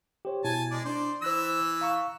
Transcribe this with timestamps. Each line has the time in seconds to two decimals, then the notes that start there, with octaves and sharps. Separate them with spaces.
0.25 G4 C5 C#5
0.44 B2 E4 G#5 A5
0.71 G#3 D5
0.85 D4 C5 D5
1.22 E3 C5 E6 F#6 A#6
1.81 F5 A#5 C#6